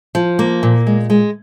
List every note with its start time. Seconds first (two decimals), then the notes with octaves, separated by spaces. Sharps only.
0.15 F3
0.39 A#3
0.63 A#2
0.87 G#3
1.10 G#3